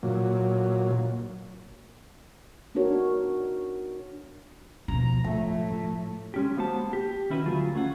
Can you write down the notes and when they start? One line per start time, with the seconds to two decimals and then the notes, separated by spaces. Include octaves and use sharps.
0.03 A#2 F#3
2.75 B3 D4 D#4 F#4 A#4 C#5
4.88 B2 F3 A#5
5.24 A2 F3 A3
5.71 F3
6.34 G#3 C#4 G4
6.57 A#3 B3 F#4 C5 F#5 A5
6.93 G4
7.30 D#3 C#4 E4 F#4 B4
7.46 D2 F#3 F4 G#4
7.75 A3 C#4 F4 F#5